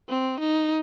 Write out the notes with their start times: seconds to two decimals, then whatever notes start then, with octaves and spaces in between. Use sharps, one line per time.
0.09 C4
0.40 D#4